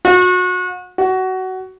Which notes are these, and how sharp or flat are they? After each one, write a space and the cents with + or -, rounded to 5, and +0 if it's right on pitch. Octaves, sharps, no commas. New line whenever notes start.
F#4 -30
F#4 +20